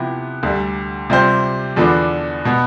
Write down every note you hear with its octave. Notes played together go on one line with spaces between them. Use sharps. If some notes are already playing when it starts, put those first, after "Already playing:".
Already playing: C3 F3 B3 E4 G4
D2 D3 G3
C3 G3 C4 F4 C5
E2 D3 F3 B3 D4
B2 B3